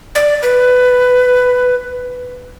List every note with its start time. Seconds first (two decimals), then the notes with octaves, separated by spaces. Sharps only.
0.15 D5
0.42 B4